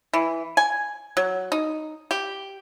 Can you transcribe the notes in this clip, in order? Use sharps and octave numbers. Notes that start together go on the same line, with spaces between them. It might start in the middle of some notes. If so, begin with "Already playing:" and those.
E3
G#5
F#3
D#4
G4